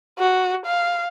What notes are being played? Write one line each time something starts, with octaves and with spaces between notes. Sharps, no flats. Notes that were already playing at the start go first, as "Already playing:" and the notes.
F#4
F5